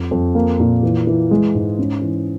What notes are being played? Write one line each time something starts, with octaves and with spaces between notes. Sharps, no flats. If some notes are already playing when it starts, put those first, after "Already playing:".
Already playing: F2
F2
A#3
A#2
E3
E3
G#3
G#2
C#4
E3